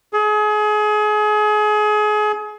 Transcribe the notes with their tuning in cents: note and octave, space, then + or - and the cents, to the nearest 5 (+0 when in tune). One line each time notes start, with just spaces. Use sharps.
G#4 +30